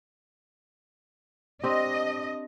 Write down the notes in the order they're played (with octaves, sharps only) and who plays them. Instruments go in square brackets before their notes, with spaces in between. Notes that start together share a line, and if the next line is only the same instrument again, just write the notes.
[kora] C4 D4 G4 [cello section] D#5